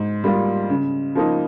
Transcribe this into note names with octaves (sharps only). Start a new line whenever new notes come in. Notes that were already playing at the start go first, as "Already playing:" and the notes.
Already playing: G#2
G3 A#3 F4
C#3
F3 A#3 D#4